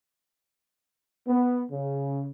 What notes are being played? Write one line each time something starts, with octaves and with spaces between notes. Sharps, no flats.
B3
C#3